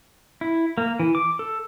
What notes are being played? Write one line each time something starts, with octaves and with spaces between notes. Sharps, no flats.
E4
A#3
E3
D6
A4